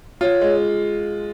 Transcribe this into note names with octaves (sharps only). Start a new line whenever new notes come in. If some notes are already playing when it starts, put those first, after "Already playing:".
F4 C#5
G#3